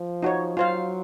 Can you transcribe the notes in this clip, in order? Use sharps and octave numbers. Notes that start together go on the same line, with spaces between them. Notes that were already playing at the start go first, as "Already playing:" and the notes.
Already playing: F3
D#4 F#4 C#5
F#3 F4 C5 F5